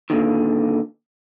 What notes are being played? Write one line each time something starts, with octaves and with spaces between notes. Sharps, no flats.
A#2 D3 D#3